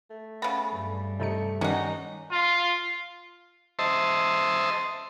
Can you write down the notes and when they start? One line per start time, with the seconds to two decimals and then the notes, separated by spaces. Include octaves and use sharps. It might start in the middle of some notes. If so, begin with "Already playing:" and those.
0.10 A3
0.42 C#3 B3 A6
0.73 G2
1.20 C3 A3 D#4 C#7
1.61 D#3 G3 C#4 D#4 F#5
2.30 F4
3.79 C5 D#5 E5 A5 C6